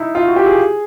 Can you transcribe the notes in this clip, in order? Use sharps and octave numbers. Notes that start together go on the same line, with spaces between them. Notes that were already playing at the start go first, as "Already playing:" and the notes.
Already playing: D#4 E4
F4
F#4
G4
G#4